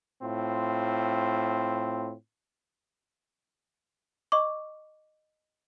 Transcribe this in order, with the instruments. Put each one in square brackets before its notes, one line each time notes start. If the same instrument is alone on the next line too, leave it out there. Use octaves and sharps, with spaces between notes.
[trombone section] A2 C4 F4
[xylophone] D#5 C#6 D6